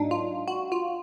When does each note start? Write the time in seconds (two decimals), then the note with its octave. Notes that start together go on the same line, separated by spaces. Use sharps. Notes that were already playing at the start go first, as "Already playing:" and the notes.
Already playing: G#2 F#3 A#3 D4 D#4
0.11 F4
0.48 F#4
0.72 F4